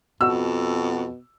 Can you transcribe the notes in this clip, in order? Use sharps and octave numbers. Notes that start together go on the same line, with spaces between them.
F2 B2 F#4 E6